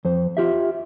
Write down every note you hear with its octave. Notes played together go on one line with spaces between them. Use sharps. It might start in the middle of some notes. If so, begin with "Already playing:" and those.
F2 C5
F4 G4 E5